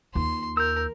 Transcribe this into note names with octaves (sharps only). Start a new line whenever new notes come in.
D#2 F4 C6
A#4 E6 G6